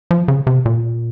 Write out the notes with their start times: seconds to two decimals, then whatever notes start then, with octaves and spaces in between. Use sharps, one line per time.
0.11 F3
0.28 C#3
0.47 C3
0.66 A#2